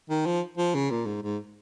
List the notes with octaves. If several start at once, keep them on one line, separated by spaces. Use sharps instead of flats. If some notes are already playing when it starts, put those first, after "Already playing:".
D#3
F3
F3
C#3
A#2
G#2
G#2